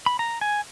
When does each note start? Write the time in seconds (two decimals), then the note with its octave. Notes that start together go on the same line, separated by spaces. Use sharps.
0.06 B5
0.19 A#5
0.41 G#5